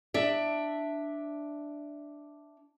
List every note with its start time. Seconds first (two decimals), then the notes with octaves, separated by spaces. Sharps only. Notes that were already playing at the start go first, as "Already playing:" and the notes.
0.14 D4 E5